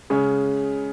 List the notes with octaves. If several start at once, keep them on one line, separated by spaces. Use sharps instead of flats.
C#3 G#3 C#4